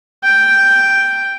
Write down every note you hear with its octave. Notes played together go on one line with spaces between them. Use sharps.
G5